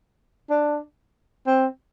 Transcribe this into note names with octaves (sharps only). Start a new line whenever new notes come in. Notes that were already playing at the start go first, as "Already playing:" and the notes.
D4
C4